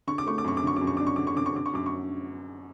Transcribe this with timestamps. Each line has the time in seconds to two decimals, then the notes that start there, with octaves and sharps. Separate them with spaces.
0.07 D3 C#6
0.18 D6
0.27 A3 C#6
0.38 D6
0.44 F#2 C#6
0.57 D6
0.63 D3 C#6
0.76 F#2 D6
0.87 C#6
0.97 D4 D6
1.07 C#6
1.16 D3 D6
1.27 C#6
1.36 D3 D6
1.46 C#6
1.55 D3 D6
1.66 C#6
1.73 F#2 D6
1.86 C#6